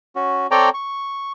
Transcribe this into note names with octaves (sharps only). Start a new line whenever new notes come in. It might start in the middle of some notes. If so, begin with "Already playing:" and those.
C#4 F#4
C4 A4 C#5 D5 G5 A#5
C#6